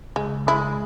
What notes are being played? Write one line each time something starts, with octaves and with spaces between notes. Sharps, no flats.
C#2 G#3
G#3 E4